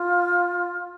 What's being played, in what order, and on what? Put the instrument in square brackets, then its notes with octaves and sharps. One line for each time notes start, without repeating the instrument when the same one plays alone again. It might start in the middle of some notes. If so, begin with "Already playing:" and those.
Already playing: [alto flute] F4